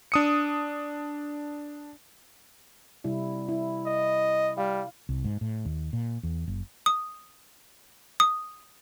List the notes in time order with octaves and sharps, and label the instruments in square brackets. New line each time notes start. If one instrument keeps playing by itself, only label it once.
[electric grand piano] D4 D#6 C#7
[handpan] C3 G3 E4
E4
[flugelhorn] D#5
[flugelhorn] G3 [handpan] F5
[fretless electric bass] C2
G#2
A2
D#2
A#2
E2
F#1
[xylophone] D#6
D#6